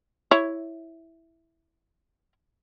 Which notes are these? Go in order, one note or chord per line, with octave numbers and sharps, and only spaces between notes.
E4 C#5